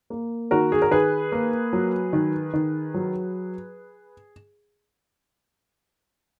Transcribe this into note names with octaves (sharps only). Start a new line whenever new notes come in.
A#3
D#3 F#4 A#4
G#4
A#4
D#3 G#4 B4
A#3
F#3
D#3
D#3
F#3